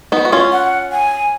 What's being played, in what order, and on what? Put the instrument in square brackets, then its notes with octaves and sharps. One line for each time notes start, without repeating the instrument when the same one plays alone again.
[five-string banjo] B3 D#4
F#4
C#4 F4
[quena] F#5
G#5